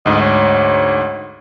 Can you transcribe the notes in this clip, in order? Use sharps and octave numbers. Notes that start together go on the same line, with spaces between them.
D2 G#2 D#5
C#5